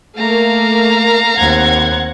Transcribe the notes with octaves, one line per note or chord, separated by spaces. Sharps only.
A3 A#3 F5 A#5
D#2 C4 F#5 G#6